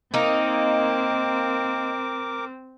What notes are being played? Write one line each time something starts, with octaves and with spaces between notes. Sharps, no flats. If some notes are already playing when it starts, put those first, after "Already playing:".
A#3 C4 D#4 A#4 D6